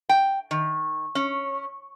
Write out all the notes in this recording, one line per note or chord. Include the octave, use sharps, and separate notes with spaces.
G5
D#3
C#4